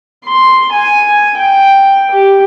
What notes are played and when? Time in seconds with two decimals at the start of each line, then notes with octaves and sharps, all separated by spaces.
0.25 C6
0.72 G#5
1.38 G5
2.11 G4